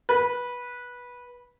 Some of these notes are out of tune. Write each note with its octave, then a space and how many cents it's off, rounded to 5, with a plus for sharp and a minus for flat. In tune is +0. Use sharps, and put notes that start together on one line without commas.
B4 -15